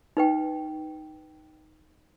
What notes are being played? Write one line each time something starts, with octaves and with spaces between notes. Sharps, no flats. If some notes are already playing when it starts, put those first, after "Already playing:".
D#4 B4 G5